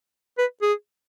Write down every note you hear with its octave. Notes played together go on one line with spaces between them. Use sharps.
B4
G#4